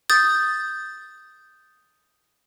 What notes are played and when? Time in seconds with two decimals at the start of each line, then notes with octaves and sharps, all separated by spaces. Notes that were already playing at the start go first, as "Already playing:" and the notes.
0.10 D#6 G6 A6